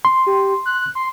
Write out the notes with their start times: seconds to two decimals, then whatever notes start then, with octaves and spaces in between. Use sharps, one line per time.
0.05 C6
0.26 G4
0.66 F#6
0.95 C6